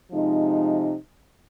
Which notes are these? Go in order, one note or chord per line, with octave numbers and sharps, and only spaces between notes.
C3 F3 G#3 D#4